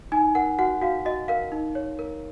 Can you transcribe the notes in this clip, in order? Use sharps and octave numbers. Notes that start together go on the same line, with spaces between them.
D#4 G#5
A#4 F#5
F#4 F#5
F#4 F5
F#4 D#5
A#4 F5
D#4
C#5
A#4